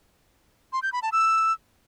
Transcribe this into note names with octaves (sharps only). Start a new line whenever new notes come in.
C6
G6
B5
A5
E6